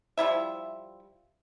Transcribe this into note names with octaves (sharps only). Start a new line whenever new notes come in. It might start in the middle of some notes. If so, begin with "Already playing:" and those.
F3 G3 E4 E5